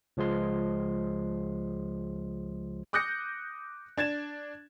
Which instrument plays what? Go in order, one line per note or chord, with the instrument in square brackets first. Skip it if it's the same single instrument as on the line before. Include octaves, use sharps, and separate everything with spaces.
[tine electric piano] C#2 F3 G#3 C6
[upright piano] D6 D#6 F#6 G6 A#6 C#7
D4 G#6 A6 E7